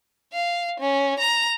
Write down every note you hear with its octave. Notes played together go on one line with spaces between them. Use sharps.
F5
C#4
A#5